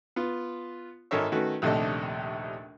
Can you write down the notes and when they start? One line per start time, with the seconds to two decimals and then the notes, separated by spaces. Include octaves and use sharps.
0.16 B3 F4
1.11 G#1 D#4 A4 A#4 C#5 E5
1.32 D#3 A3 C#4 F#4 B4
1.62 A#1 D#2 C3 A3 D4 D#5